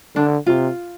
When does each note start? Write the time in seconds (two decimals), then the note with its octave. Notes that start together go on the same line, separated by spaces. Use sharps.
0.16 D3 D4
0.47 C3 F4